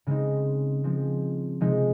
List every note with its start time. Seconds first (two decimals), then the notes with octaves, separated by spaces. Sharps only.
0.07 C#3 G#3 C4 D#4
0.84 F3 G#3 C4
1.60 C3 F3 G#3 D#4